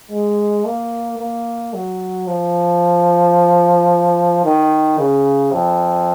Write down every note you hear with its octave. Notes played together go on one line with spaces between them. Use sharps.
G#3
A#3
A#3
F#3
F3
D#3
C#3
F2